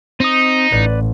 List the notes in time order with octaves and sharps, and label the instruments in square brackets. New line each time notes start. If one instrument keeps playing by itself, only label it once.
[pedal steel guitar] C4 D#6 [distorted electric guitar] D#4
[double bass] A1 [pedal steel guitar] B4 D5